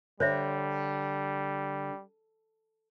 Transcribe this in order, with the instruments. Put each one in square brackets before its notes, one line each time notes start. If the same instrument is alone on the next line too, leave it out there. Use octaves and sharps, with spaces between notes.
[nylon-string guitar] D3 [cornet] G3 [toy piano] C5 C#5 E5